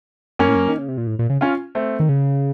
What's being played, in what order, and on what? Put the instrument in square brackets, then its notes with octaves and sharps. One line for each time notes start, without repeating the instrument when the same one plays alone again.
[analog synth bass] F#2 [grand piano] A#3 C#4
[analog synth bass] A2
F#2
D#3
C#3
C3
A#2
A2
A#2
C#3
[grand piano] C#4 F4
A3 C4
[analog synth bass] D#3
C#3